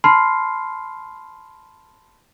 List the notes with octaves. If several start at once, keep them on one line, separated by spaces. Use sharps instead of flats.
A5 B5 C6 F6 C7